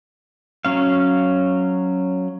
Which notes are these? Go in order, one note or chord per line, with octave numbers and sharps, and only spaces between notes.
F#3 C#4 F5